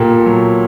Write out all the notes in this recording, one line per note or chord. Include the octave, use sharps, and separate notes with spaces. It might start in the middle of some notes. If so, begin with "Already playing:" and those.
Already playing: A#2 A#3 G4 A4
F#3